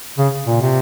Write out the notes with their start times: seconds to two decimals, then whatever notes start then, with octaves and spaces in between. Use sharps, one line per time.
0.18 C#3
0.47 A#2
0.61 C3